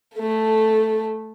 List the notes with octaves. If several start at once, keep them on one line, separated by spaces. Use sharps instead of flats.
A3 A4